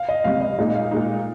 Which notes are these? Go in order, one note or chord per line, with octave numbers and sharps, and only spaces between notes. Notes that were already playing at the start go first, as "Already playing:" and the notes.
Already playing: F5
D#5
C#2 C3 G3 C4 F5
D#5
A#2 G#3 D#4 D#5
F5
A#2 G#3 D#4